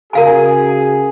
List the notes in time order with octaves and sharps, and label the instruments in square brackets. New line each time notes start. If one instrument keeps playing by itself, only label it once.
[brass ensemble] C#3 F#4 G#4 [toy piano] A#4 F5 G#5